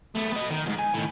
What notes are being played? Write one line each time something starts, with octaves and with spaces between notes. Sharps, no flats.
A3 B3
B3 D#5
D#3
E2 G#2
G#5
D#2 A2